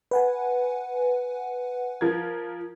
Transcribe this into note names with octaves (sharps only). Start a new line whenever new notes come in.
B4 F#5 G#5
F3 A#4 G#6